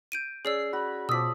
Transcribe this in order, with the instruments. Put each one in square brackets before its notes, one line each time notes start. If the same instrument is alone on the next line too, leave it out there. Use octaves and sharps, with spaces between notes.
[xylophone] G6 D7 D#7
[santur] C#4 [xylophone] G#4 D5 E6 [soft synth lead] C7
[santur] F#4 [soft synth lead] B5
[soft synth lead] B2 [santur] F3 D5 D#6 [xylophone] E6 B6